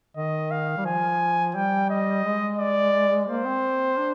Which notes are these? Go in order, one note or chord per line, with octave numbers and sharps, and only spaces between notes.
D#3 D#5
F5
G3
F3 G#5
G3 G5
D#5
G#3
D5
A#3 C5
C4
D4